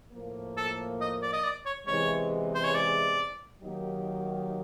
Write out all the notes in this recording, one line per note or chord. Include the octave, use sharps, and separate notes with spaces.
A2 F3 A#3
A4
D#5
D5
D#5
D5
C#5
E2 C3 E3 G#3 C#5
C5
C#5
D5
D#3 F#3 A#3 D#4 G4